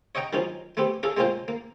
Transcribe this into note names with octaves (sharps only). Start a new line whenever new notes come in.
C#5 D#5 F#5 G5 A#5
D#3 F3 F#3 C#4 D#4
A3 B3 C4 G4
C#4 G#4 A4 F5
G#3 A#3 C4 C#4 F4 C5
A#3